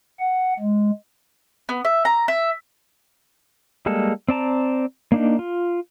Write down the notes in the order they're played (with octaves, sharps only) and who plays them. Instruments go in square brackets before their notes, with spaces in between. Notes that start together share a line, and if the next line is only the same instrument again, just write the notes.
[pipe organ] F#5
G#3
[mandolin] B3
E5
A#5
E5
[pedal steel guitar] G3 G#3 A#3 A4
C4 D5 A5 A#5
A#3 D4 D#4
F4